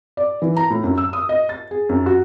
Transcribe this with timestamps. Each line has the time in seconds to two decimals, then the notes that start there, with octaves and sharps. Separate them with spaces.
0.17 D5
0.42 E3
0.56 A#5
0.70 A2
0.84 F#2
0.98 E6
1.13 D#6
1.29 D#5
1.49 A6
1.71 G#4
1.89 F#2
2.06 F#4